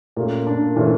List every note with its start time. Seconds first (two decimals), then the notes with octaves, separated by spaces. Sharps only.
0.17 A#2 A3 A#3 C#4 G4
0.47 D4
0.76 A#2 E3 A3 C#4 G4